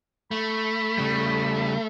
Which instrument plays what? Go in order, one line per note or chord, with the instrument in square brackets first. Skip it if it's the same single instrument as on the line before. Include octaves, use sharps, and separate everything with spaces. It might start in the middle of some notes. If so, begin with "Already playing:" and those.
[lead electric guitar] A3 [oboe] B5
[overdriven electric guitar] C#3 G3